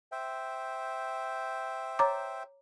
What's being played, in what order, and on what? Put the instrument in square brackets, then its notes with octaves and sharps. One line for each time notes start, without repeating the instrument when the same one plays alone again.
[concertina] C5 E5 G5
[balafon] C#5 A#5 D6